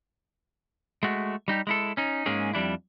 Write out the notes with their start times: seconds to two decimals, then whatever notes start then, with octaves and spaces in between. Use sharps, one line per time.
1.03 G#3 A3 F#4
1.48 G3 D#4 G4
1.67 G#3 E4 A4
1.97 C#4 D#4
2.26 G#2 G#3 A#3 C#4 G#4
2.53 F2 G3 D4 E4